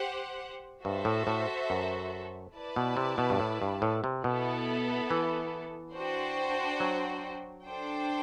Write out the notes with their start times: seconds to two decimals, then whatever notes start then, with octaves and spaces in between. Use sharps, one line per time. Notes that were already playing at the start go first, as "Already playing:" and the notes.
Already playing: G4 C5 F#5
0.84 G2 F#4 A4 C5 E5
1.05 A2
1.27 A2
1.70 F#2
2.54 E4 B4 D5 A5
2.76 B2
2.97 C3
3.18 B2
3.30 G2
3.40 A2
3.62 G2
3.82 A2
4.04 C3
4.24 B2 B3 E4 A4
5.11 E3
5.95 D4 F#4 C5 G5
6.80 F#3
7.65 D4 A4 C5 G5